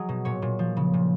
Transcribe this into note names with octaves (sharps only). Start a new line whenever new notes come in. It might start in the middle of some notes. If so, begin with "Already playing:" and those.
Already playing: F#3 G#4 D#5
B2
A#2 C#5
A#2
F3
C#3
A#2